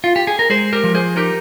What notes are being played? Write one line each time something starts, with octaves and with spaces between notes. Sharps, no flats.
F4
G4
G#4
A#4
G#3 G#4 C5
G4 A#4
F3
G#4 C5
D#4 G4 A#4